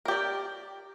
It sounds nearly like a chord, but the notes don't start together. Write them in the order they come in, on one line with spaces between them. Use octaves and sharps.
A#4 G4 D5